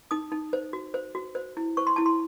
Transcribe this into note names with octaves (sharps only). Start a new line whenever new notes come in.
D#4 D#6
D#4
C5
F#4
C5
F#4
C5
E4
C5 C#6
C6
E4 A5
C6